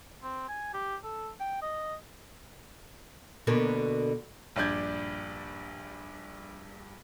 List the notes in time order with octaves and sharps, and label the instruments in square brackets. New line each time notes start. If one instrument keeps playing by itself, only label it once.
[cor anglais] C4
G#5
G4
A4
G5
D#5
[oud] B2 D3 A#3
[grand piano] A#1 G2 D4 D5 G6 G#6